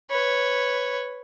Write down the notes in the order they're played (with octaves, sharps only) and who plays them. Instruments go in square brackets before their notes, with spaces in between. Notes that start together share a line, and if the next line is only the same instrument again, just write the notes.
[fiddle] B4 C#5